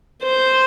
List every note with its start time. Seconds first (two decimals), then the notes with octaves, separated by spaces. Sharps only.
0.23 C5